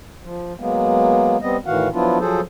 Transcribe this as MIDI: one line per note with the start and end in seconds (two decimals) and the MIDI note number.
0.24 0.53 53
0.60 1.37 54
0.60 1.37 56
0.60 1.37 58
0.60 1.37 59
1.42 1.57 55
1.42 1.57 59
1.42 1.57 60
1.42 1.57 75
1.66 1.88 45
1.66 1.88 51
1.66 1.88 52
1.66 1.88 66
1.66 1.88 77
1.66 1.88 78
1.93 2.18 53
1.93 2.18 54
1.93 2.18 59
1.93 2.18 62
1.93 2.18 64
1.93 2.18 65
2.20 2.40 53
2.20 2.40 54
2.20 2.40 68
2.20 2.40 69
2.20 2.40 72